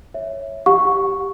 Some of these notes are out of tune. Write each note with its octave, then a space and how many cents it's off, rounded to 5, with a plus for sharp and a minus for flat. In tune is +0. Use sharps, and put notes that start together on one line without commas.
C#5 +0 E5 +0
G4 +0 F#5 -30 C#6 +0